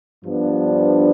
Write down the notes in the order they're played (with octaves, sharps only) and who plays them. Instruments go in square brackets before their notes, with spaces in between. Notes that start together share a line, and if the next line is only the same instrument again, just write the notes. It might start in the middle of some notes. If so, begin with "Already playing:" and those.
[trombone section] G2 F3 B3 D4